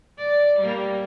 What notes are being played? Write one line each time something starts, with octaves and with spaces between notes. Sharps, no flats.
D5
G3 A#3